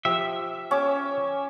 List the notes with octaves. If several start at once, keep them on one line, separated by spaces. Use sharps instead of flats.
F3 G4 E5
C#4 D6